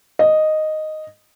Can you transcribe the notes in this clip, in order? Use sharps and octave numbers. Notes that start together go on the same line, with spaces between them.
D#5